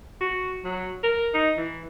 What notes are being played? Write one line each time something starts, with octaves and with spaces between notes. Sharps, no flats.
F#4
F#3
A#4
D#4
E3